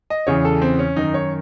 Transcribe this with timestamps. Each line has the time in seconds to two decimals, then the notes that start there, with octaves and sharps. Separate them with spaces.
0.10 D#5
0.27 E2 C#3 E3 C#5
0.45 A4
0.62 C4
0.79 C#4
0.96 F#2 D#3 D#4
1.14 C#5